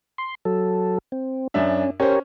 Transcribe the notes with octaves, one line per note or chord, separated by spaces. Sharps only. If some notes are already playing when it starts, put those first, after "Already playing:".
C6
F#3 A4
C4
F#2 C#4 D4 E5
C#4 G4 A#4 C5 C#5